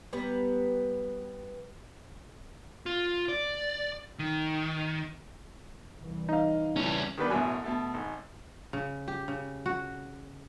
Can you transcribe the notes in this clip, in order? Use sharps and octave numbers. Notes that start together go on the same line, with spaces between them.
G3 B3 B4 A#5
F4
D5
D#3
C2 E3
D#4 D#5 F5
G2 C#3 E3 G3 C#4
D#3 G3 B3 B4 D5
A1 F#2 B2 F#3 G#5
B2 A3
G#1
C#3
G4
C#3
F#4